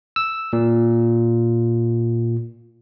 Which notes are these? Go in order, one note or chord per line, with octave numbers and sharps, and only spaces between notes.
E6
A#2